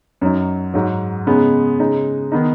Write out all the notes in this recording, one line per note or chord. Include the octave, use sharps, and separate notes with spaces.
F#2 F#3 D#4
G#2 F#3 D#4
C#3 G#3 B3 D#4
C#3 G#3 D#4
D#3 B3 D#4